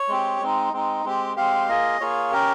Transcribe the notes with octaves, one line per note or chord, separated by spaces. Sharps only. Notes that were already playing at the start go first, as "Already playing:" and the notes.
Already playing: C#5
G#3 C4 G4
G#3 C4 D#4
G#3 C4 D#4
G#3 C4 G4
G#3 C4 G4 F5
A#3 F4 G#4 D#5
A#3 F4 G#4 C#5
C#4 G4 A#4